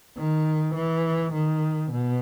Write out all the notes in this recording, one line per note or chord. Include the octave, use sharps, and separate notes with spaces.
D#3
E3
D#3
B2